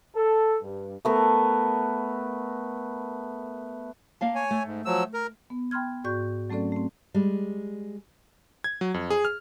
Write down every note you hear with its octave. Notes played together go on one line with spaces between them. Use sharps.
A4
G2
A3 B3 A#4
A#3 F5 A5
C#5 G#5
A3
G#2
F3 F#3 E6
A#4
B3
G5 B5 C6 F6 G#6
G#2 F#4 D5 C#6 G6
F#3 A3 C4 C#4 A4 D5
A3 C4
G3 G#3
G#6
F#3
F2
G#4
F6